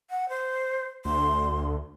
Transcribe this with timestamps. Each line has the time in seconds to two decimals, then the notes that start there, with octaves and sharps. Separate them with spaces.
0.10 F#5
0.29 C5
1.05 D2 C6